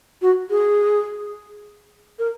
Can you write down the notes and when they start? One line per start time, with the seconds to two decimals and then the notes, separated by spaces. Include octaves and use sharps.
0.22 F#4
0.50 G#4
2.19 A#4